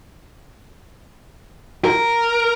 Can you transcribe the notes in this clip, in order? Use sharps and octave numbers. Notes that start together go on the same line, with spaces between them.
A#4